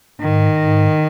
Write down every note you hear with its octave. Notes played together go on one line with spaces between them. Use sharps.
G#2 D#3
G#2